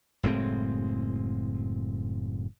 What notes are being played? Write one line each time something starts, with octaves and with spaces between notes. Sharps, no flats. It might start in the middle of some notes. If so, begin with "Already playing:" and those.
F#1 A2 G#3 C4